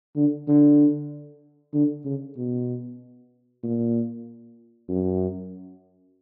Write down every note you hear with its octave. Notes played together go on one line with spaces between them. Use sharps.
D3
D3
D3
C#3
B2
A#2
F#2